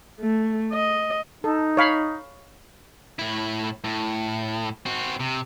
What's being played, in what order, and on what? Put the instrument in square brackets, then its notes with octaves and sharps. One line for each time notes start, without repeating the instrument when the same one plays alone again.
[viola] A3
D#5
[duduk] D#4 [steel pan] A4
[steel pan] C#5 F5 B5
[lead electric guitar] A2 E4
A2
C4 F#4
C3